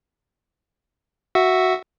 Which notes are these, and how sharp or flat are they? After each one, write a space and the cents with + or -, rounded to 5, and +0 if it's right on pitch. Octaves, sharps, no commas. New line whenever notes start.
F#4 +0 E5 +0